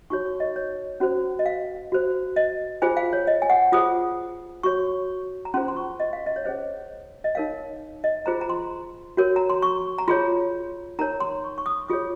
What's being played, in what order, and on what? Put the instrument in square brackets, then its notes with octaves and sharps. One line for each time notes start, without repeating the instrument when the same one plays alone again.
[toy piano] D#4 F#4 C#5 C#6
C#6
D#5
C#5
C#4 F#4 C5
D#5
F5
F#4 C5
D#5
F4 G#4 C5 G#5
F5
C#5
D#5
G#5
F#5
F4 G#4 C5 D#6
F#4 C#5 C#6
A#5
C#4 F4 G#4 C5 C6
C6
C#6
D#5
F5
D#5
C#5
C#4 G#4 C5 D#5
D#5
D#4 A#4 C#5 F5
D#5
F4 G#4 C5 A#5
A#5
C6
F#4 A#4 C#5
A#5
C6
C#6
A#5
F4 G#4 C#5 C6
D#4 A#4 C#5 A#5
C6
C#6
C#6
D#6
F4 G#4 C#5 D#6